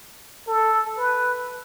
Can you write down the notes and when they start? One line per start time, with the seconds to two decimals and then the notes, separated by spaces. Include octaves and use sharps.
0.48 A4
0.97 B4